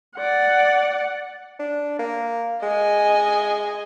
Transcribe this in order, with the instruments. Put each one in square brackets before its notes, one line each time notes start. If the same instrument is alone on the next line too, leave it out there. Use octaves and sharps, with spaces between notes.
[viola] D5 F#5
[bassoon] D4
A#3
[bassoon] G#3 [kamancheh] D#5 G#5